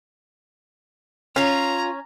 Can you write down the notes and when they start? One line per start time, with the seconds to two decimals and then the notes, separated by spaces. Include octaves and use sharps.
1.36 C#4 F4 C#5 A#5